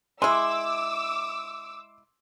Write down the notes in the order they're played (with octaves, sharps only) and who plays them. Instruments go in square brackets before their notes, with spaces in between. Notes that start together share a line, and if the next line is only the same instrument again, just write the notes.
[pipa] G#3 E4 [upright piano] C6 [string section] D6 E6